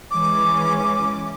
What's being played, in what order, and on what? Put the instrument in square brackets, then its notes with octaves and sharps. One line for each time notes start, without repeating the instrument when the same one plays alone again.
[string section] E3 G#3 C#4 [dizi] D6